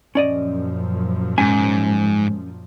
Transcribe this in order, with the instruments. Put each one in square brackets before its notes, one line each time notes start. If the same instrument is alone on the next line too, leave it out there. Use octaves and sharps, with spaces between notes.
[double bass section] F#2 A#2 F3 [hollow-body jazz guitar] C#4 D5 D#5
[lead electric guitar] G#2 [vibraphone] G#3 [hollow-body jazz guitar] C#4 G#5